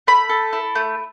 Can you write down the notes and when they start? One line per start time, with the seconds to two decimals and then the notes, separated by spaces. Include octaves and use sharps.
0.07 A3 B5
0.29 A4
0.53 E4
0.75 A3